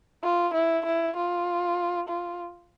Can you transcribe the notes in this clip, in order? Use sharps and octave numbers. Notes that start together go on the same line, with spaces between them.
F4
E4
E4
F4
F4